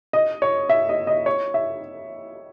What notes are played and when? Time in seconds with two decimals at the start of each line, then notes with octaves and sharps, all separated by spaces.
0.13 D#5
0.42 C#5
0.69 E5
0.89 D#5
1.07 D#5
1.26 C#5
1.54 E5